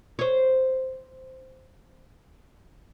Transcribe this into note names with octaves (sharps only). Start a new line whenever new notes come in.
C5 C#5